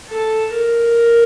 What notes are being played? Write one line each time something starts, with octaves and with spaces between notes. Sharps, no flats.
A4
A#4